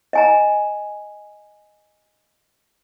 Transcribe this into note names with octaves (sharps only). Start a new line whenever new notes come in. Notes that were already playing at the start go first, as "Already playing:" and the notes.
D#5 G#5 A#5